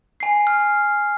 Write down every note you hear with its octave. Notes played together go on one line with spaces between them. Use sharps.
G#5 C7
F6